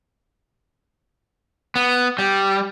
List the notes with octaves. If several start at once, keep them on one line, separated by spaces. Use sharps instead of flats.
B3
G3